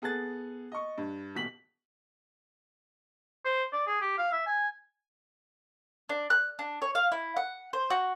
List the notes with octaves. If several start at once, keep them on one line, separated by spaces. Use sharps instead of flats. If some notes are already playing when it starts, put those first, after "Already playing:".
B3 G#4 A4 F#6 A6
D#5 C#6
G2
D#1 B2 B6 F#7
C5
D5
G#4
G4
F5
E5
G#5
D4
F#6
D4
C#5
F5
E4
F#5
C5
F#4